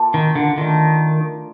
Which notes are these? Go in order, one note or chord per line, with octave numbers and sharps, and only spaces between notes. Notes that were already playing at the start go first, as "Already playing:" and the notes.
Already playing: A#3 F4 A4
D#3
D3
D#3 A3 D4 F4